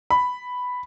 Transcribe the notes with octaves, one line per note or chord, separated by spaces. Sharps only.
B5